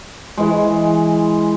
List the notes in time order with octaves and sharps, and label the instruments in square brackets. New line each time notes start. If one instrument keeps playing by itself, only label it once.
[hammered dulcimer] E3 G#3